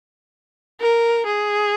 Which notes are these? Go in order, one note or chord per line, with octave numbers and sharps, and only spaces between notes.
A#4
G#4